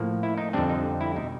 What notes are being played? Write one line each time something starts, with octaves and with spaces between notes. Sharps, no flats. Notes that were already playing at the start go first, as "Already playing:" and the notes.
Already playing: A2 F3 A#3
E4
D#4
F2 D3 G3 C4 D4
D#4
E4
B2 G3 D#4